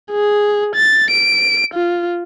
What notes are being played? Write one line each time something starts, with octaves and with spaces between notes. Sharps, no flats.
G#4
A6
D7
F4